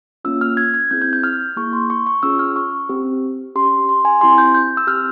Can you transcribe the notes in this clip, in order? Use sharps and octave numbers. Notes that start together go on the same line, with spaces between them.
A#3 C#4 F4 E6
F6
G#6
G#6
C4 E4 G#4 G6
G6
G6
F6
A#3 E4 G#4 C#6
C6
C#6
C#6
C#4 F4 G#4 E6
F6
C#6
C4 G4
C#4 G4 C6
C6
G#5
C4 E4 G4 C6
G6
G6
E6
C4 G4 F6